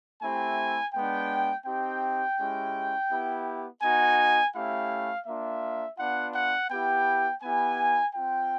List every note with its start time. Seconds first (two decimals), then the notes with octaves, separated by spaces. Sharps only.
0.22 A3 C4 E4 G4 G#5
0.94 G#3 B3 D4 G5
1.66 C4 D#4 G4 G5
2.38 G#3 C#4 E4 G4
3.10 B3 E4 G4
3.82 B3 D#4 F#4 G#5
4.54 A3 C#4 E4 G4 F5
5.26 A#3 D4 F4 E5
5.98 B3 D4 F4 F#5
6.34 F#5
6.70 B3 E4 G4 G5
7.42 B3 E4 G4 G#5
8.15 C4 F4 G5